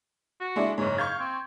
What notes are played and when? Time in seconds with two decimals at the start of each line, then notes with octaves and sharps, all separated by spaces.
0.41 F#4
0.56 G#3 D4 E4
0.78 F#1 G#2 C#5
0.98 F5 C#6 G6 G#6
1.19 C4